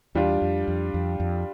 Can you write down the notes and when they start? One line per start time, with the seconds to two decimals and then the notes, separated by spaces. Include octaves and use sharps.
0.15 E2 G3 D4 F4
0.42 F2
0.68 F2
0.94 F2
1.20 F2